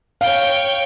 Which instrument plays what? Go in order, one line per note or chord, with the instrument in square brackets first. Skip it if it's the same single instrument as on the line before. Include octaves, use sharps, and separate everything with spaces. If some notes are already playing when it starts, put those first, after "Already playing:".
[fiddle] C#5 G5 [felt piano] F5